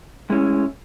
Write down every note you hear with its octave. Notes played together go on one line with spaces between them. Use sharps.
A2 G#3 C#4 E4